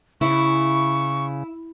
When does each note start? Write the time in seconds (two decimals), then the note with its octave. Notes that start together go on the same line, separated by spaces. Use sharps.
0.21 C#3 E4 C#6